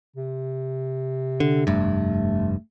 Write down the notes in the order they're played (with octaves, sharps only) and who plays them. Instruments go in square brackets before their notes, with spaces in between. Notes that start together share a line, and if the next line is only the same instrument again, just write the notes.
[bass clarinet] C3
[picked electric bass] D3
[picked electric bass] F1 G2 [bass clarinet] A3